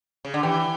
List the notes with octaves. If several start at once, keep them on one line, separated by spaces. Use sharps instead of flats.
C#3
D3
E3 G4